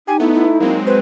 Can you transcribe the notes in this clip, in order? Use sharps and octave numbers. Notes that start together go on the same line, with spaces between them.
D#4 G4 G#5
A3 B3 E4
E4
F#3 G#3 A#3 C4
B4 C5